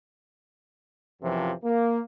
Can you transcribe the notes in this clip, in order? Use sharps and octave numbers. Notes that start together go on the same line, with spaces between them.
F#2 C3 E3 F3
A#3